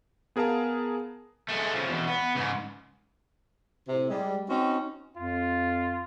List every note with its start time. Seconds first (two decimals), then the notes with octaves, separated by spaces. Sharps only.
0.36 B3 G#4 A#4 F5 A5
1.49 G#3 A3
1.75 C#3 F3
1.89 E2 B2
2.08 B3
2.35 G#2 C#3
3.88 A2 C3
4.10 G3 G#3
4.48 C4 C#4 D#4 F#4
5.17 F2 F4